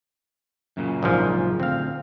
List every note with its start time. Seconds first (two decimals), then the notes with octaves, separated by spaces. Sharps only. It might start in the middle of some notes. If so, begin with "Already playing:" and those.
0.77 F#2 A#2 C#3
1.03 A#1 G#2 F3
1.60 D2 C4 F5